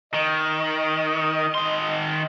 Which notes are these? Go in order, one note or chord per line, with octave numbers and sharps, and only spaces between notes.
D#3 D#5
D#3 C6